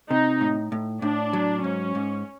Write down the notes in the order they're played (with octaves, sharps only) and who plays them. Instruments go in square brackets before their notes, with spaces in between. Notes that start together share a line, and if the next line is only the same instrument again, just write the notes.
[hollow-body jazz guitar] C3 [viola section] D#4
[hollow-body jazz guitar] A2
A2
[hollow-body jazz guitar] A2 [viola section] D4
[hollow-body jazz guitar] F#3
[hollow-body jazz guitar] G#2 [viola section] C#4
[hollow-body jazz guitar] G#2